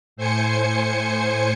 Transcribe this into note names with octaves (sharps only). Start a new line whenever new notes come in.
A2 C5 G#5 C#7